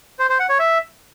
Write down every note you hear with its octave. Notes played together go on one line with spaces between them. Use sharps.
C5
C5
F#5
C#5
E5